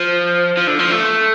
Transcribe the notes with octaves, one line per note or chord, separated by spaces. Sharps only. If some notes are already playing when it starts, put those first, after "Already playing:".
Already playing: F3
F3
D3
F3
A3